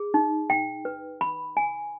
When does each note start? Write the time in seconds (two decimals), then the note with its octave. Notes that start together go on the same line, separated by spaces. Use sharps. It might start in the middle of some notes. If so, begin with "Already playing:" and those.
Already playing: G#4
0.14 D#4
0.50 G5
0.85 B4
1.21 B5
1.57 G#5